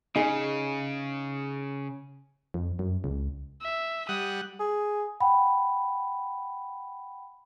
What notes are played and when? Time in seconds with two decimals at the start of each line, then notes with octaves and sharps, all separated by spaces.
0.16 C#3 D#4 G#4
2.54 F2
2.79 F#2
3.04 C#2
3.62 E5
4.09 G3 F#5 D#6
4.60 G#4
5.20 F#5 G5 B5